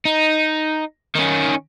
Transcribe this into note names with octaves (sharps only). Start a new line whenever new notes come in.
D#4
D#3 C#4